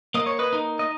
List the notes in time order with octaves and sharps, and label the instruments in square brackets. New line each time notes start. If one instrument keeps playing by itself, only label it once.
[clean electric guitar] A#3 D#5
C#5
B4 D#5
D#4
D#5